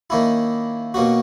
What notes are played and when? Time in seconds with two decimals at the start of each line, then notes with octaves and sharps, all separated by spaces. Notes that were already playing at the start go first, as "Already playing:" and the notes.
0.10 D#3 A#3 C#4 E4
0.94 B2 A#3 C#4 F#4